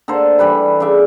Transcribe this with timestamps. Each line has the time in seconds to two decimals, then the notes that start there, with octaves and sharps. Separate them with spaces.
0.08 D3 A#3 A4 C5
0.39 E3 G3 B4 B5
0.80 C#3 G#4 D5 E5